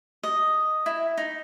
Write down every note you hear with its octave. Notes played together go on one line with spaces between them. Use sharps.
D#5
E4
D#4